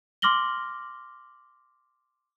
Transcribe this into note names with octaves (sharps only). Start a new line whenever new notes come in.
C6 D6 F6 A#6 F#7 G7